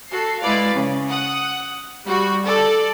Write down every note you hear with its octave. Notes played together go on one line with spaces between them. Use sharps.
F#4 A4 C7
G#3 E4 B4 D5 F5
C#3
F#5 D#6
G3 F#4
A4 D5